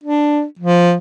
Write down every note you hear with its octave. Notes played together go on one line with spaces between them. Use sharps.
D4
F3